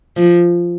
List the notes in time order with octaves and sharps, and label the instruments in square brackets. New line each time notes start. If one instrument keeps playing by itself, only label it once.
[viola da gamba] F3